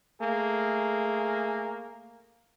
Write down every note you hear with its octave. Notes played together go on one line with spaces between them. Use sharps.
A3 A#3 G#4